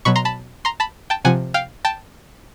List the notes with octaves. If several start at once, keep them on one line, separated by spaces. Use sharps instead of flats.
B2 F#3 B5 C#6
A#5 C6
A5 B5
A#5 C6
A5 B5
G5 A5
C3 F3 F#5 G#5
F5 G5
G5 A5